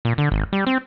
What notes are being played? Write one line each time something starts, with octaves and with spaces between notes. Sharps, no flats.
A#2
D3
G#1
G3
C4